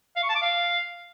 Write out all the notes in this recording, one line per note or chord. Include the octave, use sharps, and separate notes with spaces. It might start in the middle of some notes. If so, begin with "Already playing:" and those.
F5
C#6
A5
D6
F5